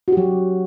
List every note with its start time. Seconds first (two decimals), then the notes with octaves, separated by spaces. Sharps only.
0.08 F#4
0.12 G4
0.17 F#3